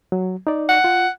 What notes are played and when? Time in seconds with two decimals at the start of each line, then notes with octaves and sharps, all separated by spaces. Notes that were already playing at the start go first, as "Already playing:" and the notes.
0.12 F#3
0.47 D#4 D5
0.69 F#5
0.84 F4